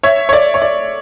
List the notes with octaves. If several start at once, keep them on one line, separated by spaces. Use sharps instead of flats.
C#5 E5
C#5
D5
C#5
D5